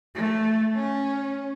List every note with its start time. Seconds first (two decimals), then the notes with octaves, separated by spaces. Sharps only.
0.15 A3
0.76 C#4